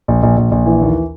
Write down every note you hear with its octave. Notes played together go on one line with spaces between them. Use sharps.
A#1
A#1
A#1
A#1
E3
D#2